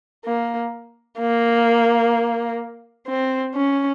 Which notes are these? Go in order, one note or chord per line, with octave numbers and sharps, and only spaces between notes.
A#3
A#3
C4
C#4